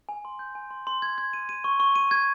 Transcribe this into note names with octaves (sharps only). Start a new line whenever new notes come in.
G#5
C6
G6
G#5
C6
C6
G#6
G#6
D#7
D#7
C#6
C#6
D#7
G#6